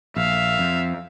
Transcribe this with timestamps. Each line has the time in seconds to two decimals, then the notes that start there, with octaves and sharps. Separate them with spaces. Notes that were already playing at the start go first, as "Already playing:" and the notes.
0.16 A#1 E5 F5
0.59 F2